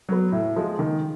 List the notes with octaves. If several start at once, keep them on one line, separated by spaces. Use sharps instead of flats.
F#3 B3
A2
F3 G#3
D#3